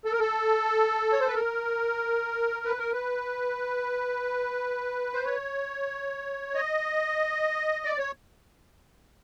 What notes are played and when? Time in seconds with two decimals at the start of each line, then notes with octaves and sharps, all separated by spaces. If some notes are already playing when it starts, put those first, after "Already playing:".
0.05 A4
0.12 A#4
0.20 A4
1.13 C#5
1.20 C5
1.27 B4
1.35 A#4
2.65 B4
2.79 A#4
2.92 B4
5.14 C5
5.25 C#5
6.55 D#5
7.85 D5
7.98 C#5